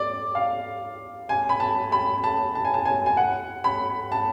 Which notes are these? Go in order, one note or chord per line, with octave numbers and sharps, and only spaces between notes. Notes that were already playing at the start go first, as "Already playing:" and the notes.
Already playing: D5
F5
G#5
B5
A5
B5
A5
A5
G#5
A5
G#5
G#5
F#5
B5
A5